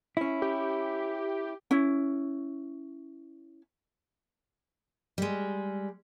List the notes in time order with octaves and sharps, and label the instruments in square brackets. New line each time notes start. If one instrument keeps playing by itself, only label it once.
[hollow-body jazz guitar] C#4 E4
[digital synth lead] G4
[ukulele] C#4 E4
[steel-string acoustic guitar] G3 G#3